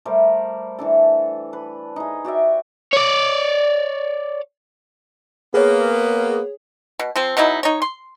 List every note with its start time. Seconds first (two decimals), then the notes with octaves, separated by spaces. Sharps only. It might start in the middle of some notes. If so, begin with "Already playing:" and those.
0.05 G3 A3 A#4 C5
0.79 E3 D4 A4
1.53 B4
1.96 D#4 G#4
2.25 F#4 G4 D5 E5
2.93 C#5 D5
5.54 A#3 B3 G#4 C#5
6.99 B2
7.16 F3 C4
7.37 B2 F#3 D#4 E4
7.63 D#4 C#5
7.82 C6